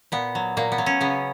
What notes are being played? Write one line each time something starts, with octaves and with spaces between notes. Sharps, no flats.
A#2 B3
F#3
A#2 A#3
B3
F#3
C#4
C#3 B3